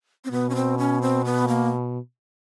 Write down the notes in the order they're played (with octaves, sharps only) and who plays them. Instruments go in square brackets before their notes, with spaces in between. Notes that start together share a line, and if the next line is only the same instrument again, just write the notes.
[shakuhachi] C4
[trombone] B2 [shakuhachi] B3
[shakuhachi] C#4
C4
C#4
C4
B3
A#3